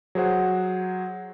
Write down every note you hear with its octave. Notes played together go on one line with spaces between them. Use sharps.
F#3 G#4 C5 F#5